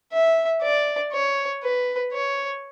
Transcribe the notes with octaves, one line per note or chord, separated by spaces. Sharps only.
E5
D5
C#5
B4
C#5